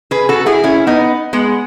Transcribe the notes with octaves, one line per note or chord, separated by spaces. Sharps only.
G#4 B4
F#4 A4
E4 G#4
C#4 E4
B3 D#4
G#3 B3